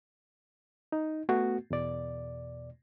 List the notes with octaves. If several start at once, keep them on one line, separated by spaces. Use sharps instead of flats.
D#4
A3 B3 F#4
E2 B2 D5